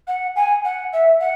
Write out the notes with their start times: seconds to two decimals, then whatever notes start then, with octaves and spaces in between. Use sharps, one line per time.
0.07 F#5
0.35 G#5
0.64 F#5
0.92 E5
1.19 F#5